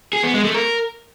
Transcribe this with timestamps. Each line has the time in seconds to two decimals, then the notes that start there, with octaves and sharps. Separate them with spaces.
0.13 G#4
0.24 B3
0.34 G#3
0.44 A3
0.55 A#4